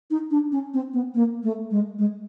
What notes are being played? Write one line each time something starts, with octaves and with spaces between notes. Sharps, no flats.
D#4
D4
C#4
C4
B3
A#3
A3
G#3
G#3